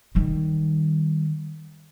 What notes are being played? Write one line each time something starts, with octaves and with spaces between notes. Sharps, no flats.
D#3 G3